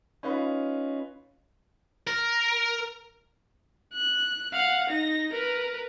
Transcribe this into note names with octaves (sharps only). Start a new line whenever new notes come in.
C#4 D#4 F4 B4 F5 B5
A#4
F#6
F5 F#5
D#4 A#6
A#4 B4